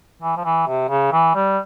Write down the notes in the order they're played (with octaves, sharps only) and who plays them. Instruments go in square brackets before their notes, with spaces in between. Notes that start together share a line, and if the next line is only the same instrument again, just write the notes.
[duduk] E3
F3
E3
C3
C#3
E3
G3